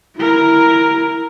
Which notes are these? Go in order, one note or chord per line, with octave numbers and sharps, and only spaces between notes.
E4 A#4